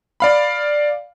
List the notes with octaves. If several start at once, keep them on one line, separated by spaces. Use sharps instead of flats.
D5 F5 B5